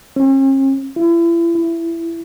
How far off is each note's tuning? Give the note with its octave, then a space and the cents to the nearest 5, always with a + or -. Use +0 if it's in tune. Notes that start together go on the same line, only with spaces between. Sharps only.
C#4 -45
E4 +35
E4 +15